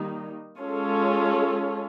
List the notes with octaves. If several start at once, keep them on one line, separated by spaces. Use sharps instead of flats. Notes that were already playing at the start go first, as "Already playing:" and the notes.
Already playing: D#3 G3 A#3 D#4
G#3 C#4 F4 A4